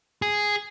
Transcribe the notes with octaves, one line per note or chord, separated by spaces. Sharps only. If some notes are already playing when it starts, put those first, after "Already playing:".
G#4